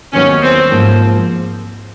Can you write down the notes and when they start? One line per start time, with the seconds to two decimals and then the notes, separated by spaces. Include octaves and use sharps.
0.13 D#2 D#3 F#3 B3 C#4 D#4
0.42 C4
0.71 G#2 F3 A#3